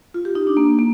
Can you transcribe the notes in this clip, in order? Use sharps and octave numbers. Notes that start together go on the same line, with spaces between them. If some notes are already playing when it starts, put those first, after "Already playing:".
F4
G4
D#4
D4
A#3
A#3